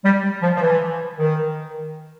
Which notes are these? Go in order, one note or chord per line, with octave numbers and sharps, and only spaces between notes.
G3
F3
F3
E3
D#3